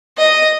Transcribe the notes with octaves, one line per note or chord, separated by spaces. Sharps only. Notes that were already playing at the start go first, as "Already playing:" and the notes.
D#5